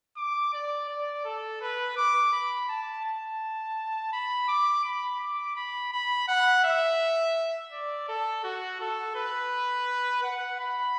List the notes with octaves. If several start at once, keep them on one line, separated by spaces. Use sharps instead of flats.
D6
D5
D5
A4
B4
D6
B5
A5
A5
B5
D6
B5
D6
B5
B5
F#5
E5
D5
A4
F#4
A4
B4
F#5
B5